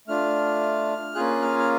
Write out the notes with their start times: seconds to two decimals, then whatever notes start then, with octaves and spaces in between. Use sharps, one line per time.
0.08 A3 D4 F4 F6
1.15 A#3 C#4 F4 G#4 F#6
1.42 F6
1.59 F6